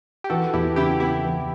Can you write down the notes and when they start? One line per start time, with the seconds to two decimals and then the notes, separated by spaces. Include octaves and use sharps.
0.24 G4
0.30 E3 F#4 A4
0.53 E2 E4 G4
0.76 C#3 E4 G4
1.00 B3 E4 G4
1.24 E3